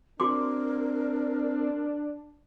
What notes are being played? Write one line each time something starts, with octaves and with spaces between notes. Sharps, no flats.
C4 D4 F#4 A#4 C6 D6